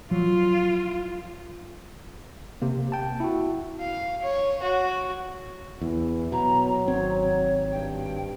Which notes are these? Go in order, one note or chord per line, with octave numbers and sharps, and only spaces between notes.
F3 F#3 F4
C3 A#3
G5 A5
E4 F#4
F5
C#5
F#4
E2 E3
B2 F#3 A#5
G#1 C4 C#5
C#5
G2 G5